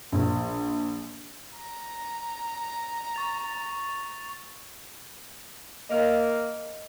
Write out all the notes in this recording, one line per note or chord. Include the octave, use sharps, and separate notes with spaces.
A#1
A#5
C#6 A6 F7
A#3 D#5